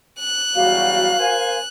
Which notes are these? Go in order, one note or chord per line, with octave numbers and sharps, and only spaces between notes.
F#6
E2 F#3 G3 F#4 F5
A#4 C5 G#5